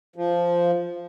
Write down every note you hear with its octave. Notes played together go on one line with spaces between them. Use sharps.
F3